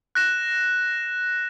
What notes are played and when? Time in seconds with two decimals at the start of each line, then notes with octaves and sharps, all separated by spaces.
0.15 F#6 A#6 E7